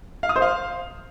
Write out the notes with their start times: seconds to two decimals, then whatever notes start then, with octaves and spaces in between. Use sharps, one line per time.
0.23 F5
0.29 D#6
0.36 C5
0.42 F5